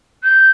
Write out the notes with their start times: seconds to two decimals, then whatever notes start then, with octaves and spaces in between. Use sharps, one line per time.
0.23 G6